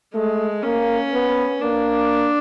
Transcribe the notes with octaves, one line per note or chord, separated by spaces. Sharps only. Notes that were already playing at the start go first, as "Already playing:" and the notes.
G#3 A3
A#3 C#4
B3
A#3 D4